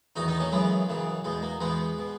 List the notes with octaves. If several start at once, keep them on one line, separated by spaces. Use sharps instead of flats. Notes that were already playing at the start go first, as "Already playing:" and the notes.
E2 D#3 D#4 F#4
B3 D#4
A#3 C#4
F#2 C#3 E3 G#3 B3
F#2 C#3 E3
E2 B2 G#3
A#3
E2 B2 G#3 B3
B2